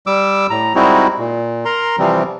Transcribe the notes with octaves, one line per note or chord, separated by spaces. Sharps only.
G3 D6 E6
A2 A#5
G3 G#3 C4 D#4 E4 F#4
A#2
A#4 A#5 C6
C3 E3 F3 G3 C4